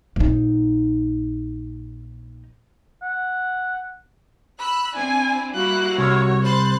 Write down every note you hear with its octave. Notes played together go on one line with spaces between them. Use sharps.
A#1 D#4
F#5
B5 E6 F#6
C4 D4 E4 G#5
G3 A#3 E4 F#4 F#6
C2 C#5
C5 B5 C6 F#6 A6